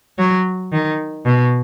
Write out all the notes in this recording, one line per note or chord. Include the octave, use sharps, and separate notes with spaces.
F#3
D#3
B2